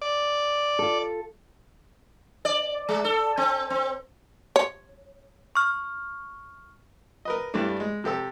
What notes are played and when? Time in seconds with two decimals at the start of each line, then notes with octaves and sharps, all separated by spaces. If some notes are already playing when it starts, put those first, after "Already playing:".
0.02 D5
0.79 F4 A4
2.45 D5
2.89 G#3
3.04 A4
3.37 C4
3.70 C4
4.56 C#5
5.55 C#6 F6
7.25 A#4 B4 D#5
7.54 G2 E3 G3 A3 D4
7.80 G#3
8.04 C3 G4 A4 E6